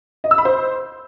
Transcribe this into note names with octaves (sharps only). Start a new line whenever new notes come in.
D#5
E6
B5
C5